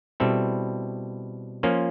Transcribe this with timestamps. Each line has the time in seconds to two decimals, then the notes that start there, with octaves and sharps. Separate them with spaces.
0.20 B2 G3 C4 E4 A4
1.63 F3 A#3 C#4 F4